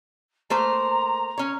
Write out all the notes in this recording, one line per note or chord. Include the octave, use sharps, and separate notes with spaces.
A3 A#3 C5 A#5
C#4 C#5